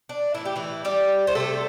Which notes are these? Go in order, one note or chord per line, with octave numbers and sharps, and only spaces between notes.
D4
A2 E3 A3 E4
G4
E3 E4
G3 G4
C5
C3 G3 A3 A4